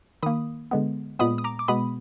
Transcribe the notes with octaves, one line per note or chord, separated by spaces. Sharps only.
D#3 A#3 B5 D#6
D3 G#3 B3
A#2 G#3 B3 B5 D#6
D#6
A#5 D6
D6
B2 G#3 B3 B5 D#6